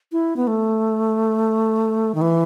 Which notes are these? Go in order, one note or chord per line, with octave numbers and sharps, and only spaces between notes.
E4
B3
A3
D#3
E3